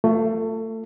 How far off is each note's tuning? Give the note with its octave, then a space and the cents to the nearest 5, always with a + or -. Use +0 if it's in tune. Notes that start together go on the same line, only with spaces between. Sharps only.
A3 +25 F4 +0